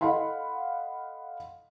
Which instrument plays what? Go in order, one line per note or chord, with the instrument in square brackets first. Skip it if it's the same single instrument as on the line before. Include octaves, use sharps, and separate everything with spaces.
[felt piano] A4 D#5 F5 F#5 B5 C6